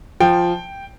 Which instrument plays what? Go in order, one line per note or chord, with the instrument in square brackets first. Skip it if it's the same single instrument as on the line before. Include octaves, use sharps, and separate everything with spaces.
[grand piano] F3 G5